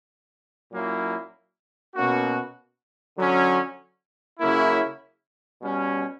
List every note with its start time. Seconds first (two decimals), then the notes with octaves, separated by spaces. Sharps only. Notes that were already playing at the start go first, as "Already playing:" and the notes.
0.72 A#2 F#3 A#3 C#4 E4
1.95 B2 A#3 C#4 F#4
3.17 D3 F#3 C#4
4.39 C#3 F#3 A#3 C#4 E4
5.61 B2 G3 C#4